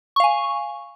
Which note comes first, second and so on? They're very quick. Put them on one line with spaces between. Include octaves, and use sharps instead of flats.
C#6 F5 G#5